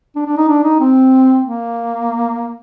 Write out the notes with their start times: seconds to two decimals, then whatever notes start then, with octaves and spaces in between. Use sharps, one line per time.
0.16 D4
0.26 D4
0.37 D#4
0.49 D4
0.64 D#4
0.80 C4
1.45 A#3